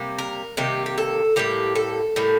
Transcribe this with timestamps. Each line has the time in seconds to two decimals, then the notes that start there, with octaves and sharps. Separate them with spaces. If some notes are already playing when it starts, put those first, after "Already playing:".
Already playing: C3 G3 A#3
0.19 A#4
0.57 C3 D#3 G3 A#3 G4
0.86 G4
0.98 A4
1.36 A2 G3 A#3 G4
1.75 A4
2.16 A2 G3 A#3